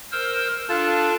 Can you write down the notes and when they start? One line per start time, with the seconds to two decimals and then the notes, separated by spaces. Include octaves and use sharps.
0.12 A#4 C5 E6
0.69 D4 F4 A4 A5